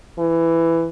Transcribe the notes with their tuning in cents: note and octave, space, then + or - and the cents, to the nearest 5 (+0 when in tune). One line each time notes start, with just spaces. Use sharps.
E3 +10